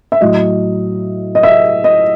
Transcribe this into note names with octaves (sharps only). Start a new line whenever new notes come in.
E5
A2 F#3 D#5
D#5
E5
D#5